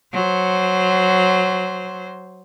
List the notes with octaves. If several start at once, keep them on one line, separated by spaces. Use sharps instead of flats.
F#3 C5